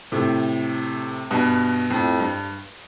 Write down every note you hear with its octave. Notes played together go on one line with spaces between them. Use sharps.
A2 C3
G2 B2
F2 A2
G2